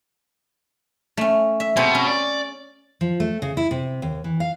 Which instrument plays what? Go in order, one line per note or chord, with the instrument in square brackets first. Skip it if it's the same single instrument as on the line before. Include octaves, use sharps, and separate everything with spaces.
[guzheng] A3 C#4
E5
[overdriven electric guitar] B2 [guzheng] C4 G#4 C5
[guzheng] C#4
[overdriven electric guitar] D5
[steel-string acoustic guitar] F3
A3
C#3
E4
C3
D#2
E3
F5